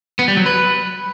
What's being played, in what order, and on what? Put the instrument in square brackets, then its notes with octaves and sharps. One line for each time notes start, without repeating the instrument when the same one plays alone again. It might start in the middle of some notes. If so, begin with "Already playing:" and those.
[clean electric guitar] B3
G3
F#3
B4